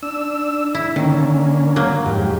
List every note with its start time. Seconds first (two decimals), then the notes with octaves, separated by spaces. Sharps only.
0.03 D4 E6
0.75 E4
0.96 D3 D#3 A#3 C#4
1.76 F#3 A#3
2.06 F2 G#2 G4